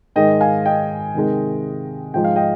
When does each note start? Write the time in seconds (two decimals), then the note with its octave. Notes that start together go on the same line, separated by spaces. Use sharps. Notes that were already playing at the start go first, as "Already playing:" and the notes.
0.16 G#2 D#3 G#3 D#5 G5
0.41 F5 G#5
0.66 D#5 G5
1.15 C3 D#3 G#3
2.14 G#2 F3 G#3 G5
2.24 F5
2.36 D#5 G5